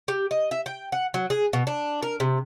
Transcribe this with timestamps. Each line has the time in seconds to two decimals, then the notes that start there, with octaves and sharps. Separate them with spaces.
0.08 G4
0.31 D#5
0.51 E5
0.66 G5
0.92 F#5
1.14 F#3
1.30 G#4
1.53 B2
1.67 D4
2.03 A#4
2.20 C3